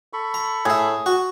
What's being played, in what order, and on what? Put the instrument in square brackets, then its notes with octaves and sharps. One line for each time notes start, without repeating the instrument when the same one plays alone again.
[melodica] A4 B5 C#6
[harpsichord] A#5
[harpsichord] A2 E5 [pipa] G#4
[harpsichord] F#4